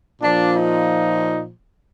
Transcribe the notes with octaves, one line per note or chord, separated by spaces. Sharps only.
A#2 F3 D4
D#4